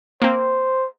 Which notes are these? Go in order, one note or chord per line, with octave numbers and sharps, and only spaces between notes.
A#3 C4 C5